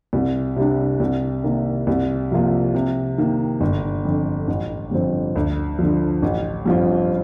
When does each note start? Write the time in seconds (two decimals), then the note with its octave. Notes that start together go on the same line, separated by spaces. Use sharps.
0.13 C2
0.56 C3 G3 D4
1.00 C2
1.44 C3 D#3 A#3
1.87 C2
2.31 C3 F3 A#3 F4
2.74 C3
3.18 D#3 A#3
3.61 G1
4.05 F2 D3
4.48 A1
4.91 G2 D3 F3 C4
5.36 D2
5.79 D3 F3
6.22 A1
6.66 G2 F3 C4 F4